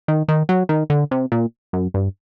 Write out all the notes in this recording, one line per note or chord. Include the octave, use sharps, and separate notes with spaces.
D#3
D#3
F#3
D#3
D3
C3
A#2
F#2
G2